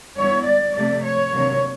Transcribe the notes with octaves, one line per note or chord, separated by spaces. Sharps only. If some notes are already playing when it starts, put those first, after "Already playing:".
D3 G3 B3 E4 C#5
D5
C3 F3 A3 D5
C#5
C3 D#3 F#3 A#3 D4